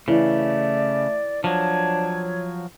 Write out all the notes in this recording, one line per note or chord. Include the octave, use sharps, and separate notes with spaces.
C#3 E3 A3 D5
F3 F#3 D4 C#5